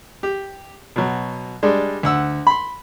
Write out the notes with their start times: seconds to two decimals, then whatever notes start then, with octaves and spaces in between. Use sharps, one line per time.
0.23 G4
0.96 B2 F#3
1.63 G3 G#3 D4
2.03 D2 F#5 E6
2.47 B5 C6